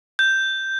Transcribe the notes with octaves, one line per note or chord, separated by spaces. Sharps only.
G6